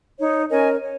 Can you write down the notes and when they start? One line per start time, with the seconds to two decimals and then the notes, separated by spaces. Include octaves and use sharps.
0.18 D#4 C#5
0.50 C#4 A#4 C#5 D#5 G#5
0.83 C#5